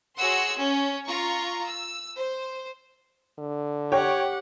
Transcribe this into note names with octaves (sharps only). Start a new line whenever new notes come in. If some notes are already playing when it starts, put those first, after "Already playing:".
F#4 G#4 C#5 F#5 C6 E6
C#4
F4 A#5 C#6
E6
C5
D3
G4 C#5 F#5 G5